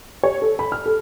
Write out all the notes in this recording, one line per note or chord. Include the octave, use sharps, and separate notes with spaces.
C#5
A4
B5
F6
A4